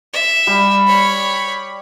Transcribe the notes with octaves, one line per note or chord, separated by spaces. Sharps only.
E5
G3
C#5 B5